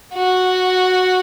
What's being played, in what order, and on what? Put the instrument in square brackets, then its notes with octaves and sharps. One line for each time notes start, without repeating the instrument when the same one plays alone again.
[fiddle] F#4